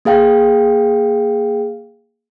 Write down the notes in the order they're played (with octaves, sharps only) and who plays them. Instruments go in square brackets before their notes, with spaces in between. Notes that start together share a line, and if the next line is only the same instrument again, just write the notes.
[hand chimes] A#3 G#4 F5 G5